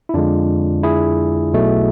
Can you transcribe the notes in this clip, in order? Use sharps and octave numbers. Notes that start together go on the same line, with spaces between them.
E4
F2 D3 G#3 D4 F4
E4 G#4
B1 B2 A3